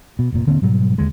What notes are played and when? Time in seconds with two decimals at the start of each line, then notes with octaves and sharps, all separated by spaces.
0.19 B2
0.32 F1 A#2
0.46 D#1 D3 A#3 C4
0.62 G#2 B2 F#3 G3
0.98 D#2 D3 G#3